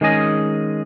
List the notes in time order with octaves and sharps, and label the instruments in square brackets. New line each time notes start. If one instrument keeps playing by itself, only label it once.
[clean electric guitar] D#3 G#3 C#4 G#4 D#5